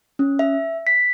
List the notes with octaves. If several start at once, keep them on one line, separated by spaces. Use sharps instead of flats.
C#4
E5
B6